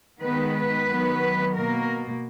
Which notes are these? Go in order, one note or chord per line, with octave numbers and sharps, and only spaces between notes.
D#3 G#3 B3 B4
B4
D#3 F#3 B3
B2 A#3 A#4